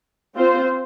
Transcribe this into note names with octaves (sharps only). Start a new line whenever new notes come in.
C4 F4 C5